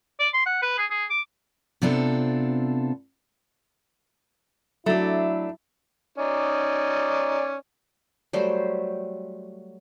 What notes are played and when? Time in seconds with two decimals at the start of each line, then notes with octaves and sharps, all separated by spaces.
0.20 D5
0.34 C6
0.46 F#5
0.62 B4
0.78 G#4
0.91 G#4
1.10 D6
1.82 C3 B3 C4 D4 F4 A4
4.86 F#3 A3 D4 E4
6.18 C#4 D#4 D5
8.33 F#3 G3 A3 C5